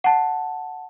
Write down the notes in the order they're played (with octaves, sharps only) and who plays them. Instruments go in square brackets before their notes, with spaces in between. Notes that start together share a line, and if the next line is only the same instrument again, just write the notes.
[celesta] F#5 A5